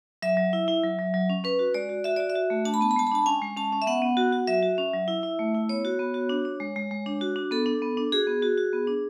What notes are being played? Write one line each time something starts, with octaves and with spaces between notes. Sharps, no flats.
F#3 E5
F#3
E4
E4
F#3
F#3
F#3
C#4
C#4 B4
F#4
G#3 D5
F#4
F#4 E5
F#4 D5
E5
F#4
A3
D4 A5
B5
B3 A5
B5
G#3 A5
B5
D4 A5
C#4 G#5
G#3
C#4 A5
C#4
E5
B3 F#5
B3
F#4
F#4
F#3 E5
F#4
C#4
F#3
E4
E4
A3
E4
B3 C#5
F#4
B3
F#4
D4
D4
G#3
G#3
G#3
D4
F#4
D4
B3 A4
D4
B3
D4
F#4 G#4
B3
F#4
F#4
B3
D4